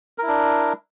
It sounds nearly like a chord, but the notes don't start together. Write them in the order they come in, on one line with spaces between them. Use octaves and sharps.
A#4 E4 D4